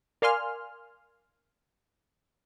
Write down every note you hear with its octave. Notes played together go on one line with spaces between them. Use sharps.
A#4 D5 F5 G#5 C6 F6